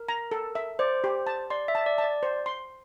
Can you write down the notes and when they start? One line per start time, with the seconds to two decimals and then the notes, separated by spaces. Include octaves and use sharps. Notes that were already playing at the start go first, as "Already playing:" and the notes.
Already playing: A#4
0.09 A#5
0.31 A4
0.55 E5
0.79 C5 D5
1.04 G4
1.27 A5
1.50 D5 C6
1.68 E5
1.75 A5
1.86 D5
1.98 A5
2.04 D5
2.23 C5
2.46 C6